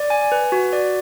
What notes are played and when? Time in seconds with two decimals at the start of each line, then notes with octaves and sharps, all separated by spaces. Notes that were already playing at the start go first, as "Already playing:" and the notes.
Already playing: D5
0.10 G#5
0.32 B4
0.52 F#4
0.73 D5